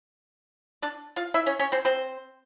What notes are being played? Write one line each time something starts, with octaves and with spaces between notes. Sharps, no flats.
D4 D5
F4 F5
E4 E5
C#4 C#5
C#4 C#5
C4 C5
C4 C5